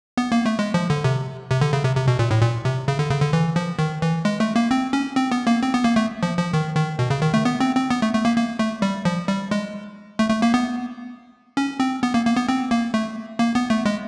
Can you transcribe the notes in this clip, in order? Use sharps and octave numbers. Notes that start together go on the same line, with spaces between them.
B3
A#3
A3
G#3
F3
D3
C3
C3
D3
C#3
C3
C3
B2
A#2
A2
A#2
C3
C#3
D3
C#3
D3
E3
F3
D#3
E3
G#3
A3
A#3
C4
C#4
C4
B3
A#3
C4
B3
A#3
A3
F3
F3
D#3
D#3
B2
C#3
D#3
A3
B3
C4
C4
B3
A3
A3
A#3
A#3
A3
G3
F3
G3
G#3
A3
A3
A#3
B3
C#4
C4
B3
A#3
A#3
B3
C4
A#3
A3
A#3
B3
A3
G#3